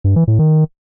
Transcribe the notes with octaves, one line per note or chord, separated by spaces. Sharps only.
G2
E3
A2
D#3